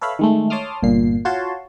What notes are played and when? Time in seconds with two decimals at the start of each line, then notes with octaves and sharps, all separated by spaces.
0.01 A4 B4 C#5 E5 F5 B5
0.19 D#3 G#3 A3
0.50 C#5 A5 C6 D6 D#6 F6
0.83 G1 A#2 C7
1.25 F4 F#4 C#5 A5 C6